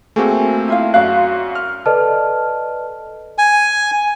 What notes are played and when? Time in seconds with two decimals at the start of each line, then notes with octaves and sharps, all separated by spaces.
0.16 A3 A#3 C4 F#4 G#4
0.68 E4 F4 F5
0.94 F#2 F#4 D5 F5 F#6
1.55 F6
1.86 A4 B4 D5 D#5 A5 F6
3.38 G#5